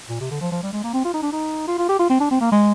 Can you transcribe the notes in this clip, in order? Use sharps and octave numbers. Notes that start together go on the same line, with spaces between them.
A#2
C3
D3
F3
F3
G3
G#3
A#3
C4
F4
D#4
D4
D#4
F4
F4
G4
F4
C4
D4
C4
A#3
G#3